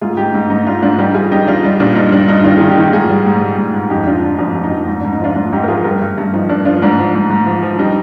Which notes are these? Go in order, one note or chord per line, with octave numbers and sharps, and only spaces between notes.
G#2 F4 G#4
G#2 D#4 G4
G#2 D#4
G#2 D#4
G#2 D4 F4
G#2 D4 F4
G3 D#4 G4
G3 F4 G#4
G3 D#4 G4
G3 D4 F4
G3 D#4
A#2 D4
G2 D#4
G3 D4
G2 D#4
D#3 D4 F4
D#3 G#4
D#4 G4
D#3
G#2 F4 G#4
G3
G#2
G3
G#2
G#2
F2 D#4 G4
D3 D4 F4
D3 D#4
F2 D4
F2
D#4
F2
G#2
G#2 D4
D#4
F3 D4 F4
G#2 D4 F4
G#2 D#4 G4
A#4
F3 F4 G#4
G2 G4 A#4
G2
G2
F3 D#4
G2 D4
F3 D4 F4
G#2 D4
F3
G#2
G#2
F3
F3
G3 D#4